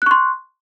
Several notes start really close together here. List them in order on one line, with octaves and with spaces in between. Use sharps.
F#6 C#6 C6